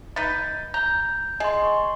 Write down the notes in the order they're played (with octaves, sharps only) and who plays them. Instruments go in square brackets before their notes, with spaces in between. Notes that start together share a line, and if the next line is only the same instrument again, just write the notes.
[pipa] D#4 B4 [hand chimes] G6 A6
[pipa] A#5 [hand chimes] G6
[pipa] G#4 [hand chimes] D#5 C6
[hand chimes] C#6